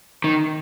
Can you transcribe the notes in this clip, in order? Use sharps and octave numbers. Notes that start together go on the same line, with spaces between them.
D#3